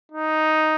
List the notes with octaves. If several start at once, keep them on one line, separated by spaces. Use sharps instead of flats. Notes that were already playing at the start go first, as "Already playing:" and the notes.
D#4